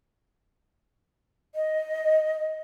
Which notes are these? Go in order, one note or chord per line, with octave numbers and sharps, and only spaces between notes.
D#5